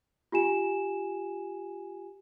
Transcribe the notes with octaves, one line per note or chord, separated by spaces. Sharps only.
F4 G4 G#5 E7